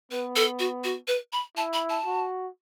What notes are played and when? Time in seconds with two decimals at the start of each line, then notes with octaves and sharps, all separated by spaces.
0.11 B3 B4
0.36 A4
0.59 F#4
0.84 F#4
1.08 B4
1.33 B5
1.57 E4 A5
1.73 B5
1.89 A5
2.06 F#4